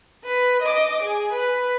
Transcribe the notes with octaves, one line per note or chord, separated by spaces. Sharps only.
B4
D#5 D6
G#4
B4